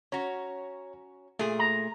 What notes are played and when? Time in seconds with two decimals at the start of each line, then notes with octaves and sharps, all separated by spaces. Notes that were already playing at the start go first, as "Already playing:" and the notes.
0.12 C#4 F#4 C#5 A#5
1.39 A#2 A3 G#4
1.59 A#5